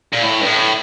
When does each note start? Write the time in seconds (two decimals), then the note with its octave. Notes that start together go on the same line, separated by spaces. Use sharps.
0.13 A#2
0.23 A2
0.41 G2
0.46 A2